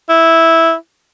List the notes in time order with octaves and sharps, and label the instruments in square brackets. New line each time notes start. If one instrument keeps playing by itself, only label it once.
[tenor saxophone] E4